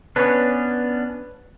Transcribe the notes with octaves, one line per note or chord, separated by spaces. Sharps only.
B3 C#4 D4 B4 C#5